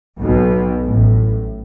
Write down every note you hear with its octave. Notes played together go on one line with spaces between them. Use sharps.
B1 B2
A1 A2